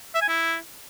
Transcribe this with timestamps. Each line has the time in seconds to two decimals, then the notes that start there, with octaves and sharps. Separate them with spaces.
0.15 E5
0.22 G#5
0.28 E4